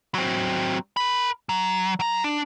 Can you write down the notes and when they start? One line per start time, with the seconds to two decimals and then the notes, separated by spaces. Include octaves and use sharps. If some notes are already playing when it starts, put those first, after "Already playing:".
0.14 F#3 C4
0.97 A#4 B5
1.49 F#3
2.00 F#3 A#5
2.24 D4